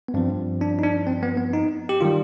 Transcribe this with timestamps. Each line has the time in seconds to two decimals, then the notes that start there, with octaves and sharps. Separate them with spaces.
0.08 B3
0.14 G2 F3 C4
0.61 D4
0.79 D#4
0.83 D4
1.07 C4
1.23 B3
1.37 B3
1.53 D#4
1.89 G4
2.01 D#3 G3 F4